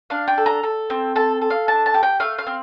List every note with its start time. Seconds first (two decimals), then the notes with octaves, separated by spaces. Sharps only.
0.10 D4 F5
0.28 G5
0.38 A4
0.46 A#5
0.63 A4
0.90 C4
1.16 A4 A5
1.42 A4
1.50 F5
1.68 D4 A5
1.86 A5
1.94 G4
2.03 G5
2.20 A3 F5
2.38 F5
2.47 C4